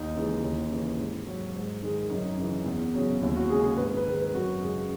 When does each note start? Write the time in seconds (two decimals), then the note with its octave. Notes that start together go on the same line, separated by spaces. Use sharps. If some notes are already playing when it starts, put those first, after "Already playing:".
Already playing: D#2 D#4
0.15 C#3 E3 G#3
0.43 D#2
0.70 C#3 E3
0.99 G#2
1.26 F#3
1.55 G#2
1.82 D#3 G#3
2.10 F#2 D#4
2.37 C#3 E3
2.65 E2
2.94 C#3 F#3
3.21 D#2 E4
3.36 F#4
3.49 C#3 G#3 G#4
3.63 G#4
3.77 G#2 B4
3.97 B4
4.06 D#3 G#3
4.15 B4
4.33 F#2 F#4
4.61 C#3 G#3